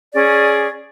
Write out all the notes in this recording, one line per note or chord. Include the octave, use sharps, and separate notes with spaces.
C#4 G#4 D5